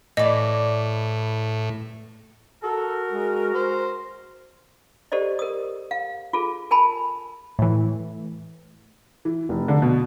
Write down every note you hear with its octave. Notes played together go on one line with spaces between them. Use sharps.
A2 E3 D5 D#5
F#4 A4 A#4
G#3
C5
G4 A4 C5 D5 D#5
A#4 D#6
F5
F4 G#4 A4
A#4 G#5 A5 B5
A2 E3
E3
F1
D3
B2